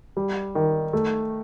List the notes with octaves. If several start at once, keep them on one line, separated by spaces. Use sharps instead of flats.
G3
D#3
A3